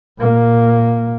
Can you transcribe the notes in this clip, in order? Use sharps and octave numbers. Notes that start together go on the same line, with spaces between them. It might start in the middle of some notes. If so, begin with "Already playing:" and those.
A#2 A#3